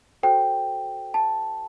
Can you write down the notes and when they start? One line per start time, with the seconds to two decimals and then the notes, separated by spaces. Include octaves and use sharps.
0.23 F#4 A4 C5 G5
1.14 A5